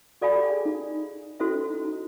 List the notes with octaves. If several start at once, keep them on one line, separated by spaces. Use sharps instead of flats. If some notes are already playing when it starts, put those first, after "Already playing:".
F#4 A4 D5 F5 G#5 B5
G4
G#4
D#4
C#4 E4 F#4 A4 C5 E5
D#4
D#4
D#4